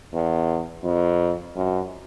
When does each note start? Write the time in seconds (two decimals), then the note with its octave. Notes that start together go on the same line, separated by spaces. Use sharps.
0.13 E2
0.84 F2
1.55 F#2